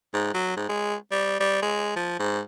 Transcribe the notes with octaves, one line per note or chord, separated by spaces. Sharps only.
G#2
F#3
G#2
G#3
G3
G3
G#3
F3
G#2